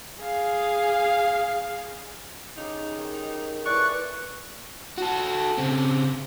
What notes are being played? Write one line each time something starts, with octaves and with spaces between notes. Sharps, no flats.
G#4 F5
C#3 D#4 G4
D#3
E3 G#4 A4 D5 C#6 F#6
F#4 A4
C#3 C4